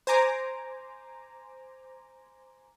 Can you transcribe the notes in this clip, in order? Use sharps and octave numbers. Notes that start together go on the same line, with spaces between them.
C5 G#5 A#5 D6